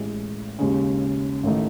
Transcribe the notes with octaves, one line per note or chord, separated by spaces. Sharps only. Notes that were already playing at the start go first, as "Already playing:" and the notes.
Already playing: A1 A2 G#3
D#2 C#3 G#3 C#4
A1 D#3 A3 D#4